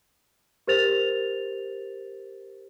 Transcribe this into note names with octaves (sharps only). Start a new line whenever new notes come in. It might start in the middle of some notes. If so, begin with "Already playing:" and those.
G4 A#4 C5 A6 F7